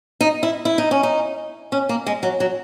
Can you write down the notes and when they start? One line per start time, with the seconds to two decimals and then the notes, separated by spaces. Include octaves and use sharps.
0.21 D#4
0.43 E4
0.65 E4
0.78 D#4
0.91 C#4
1.03 D#4
1.72 C#4
1.89 A#3
2.06 G#3
2.23 F#3
2.40 F#3